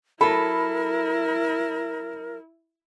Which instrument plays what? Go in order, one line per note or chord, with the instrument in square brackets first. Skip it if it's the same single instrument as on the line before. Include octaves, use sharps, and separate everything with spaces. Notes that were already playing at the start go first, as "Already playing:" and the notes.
[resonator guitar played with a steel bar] F#3 A4 [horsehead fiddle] E4 [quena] A#4 [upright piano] B5